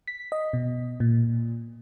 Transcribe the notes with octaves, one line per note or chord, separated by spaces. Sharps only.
B6
D#5
B2
A#2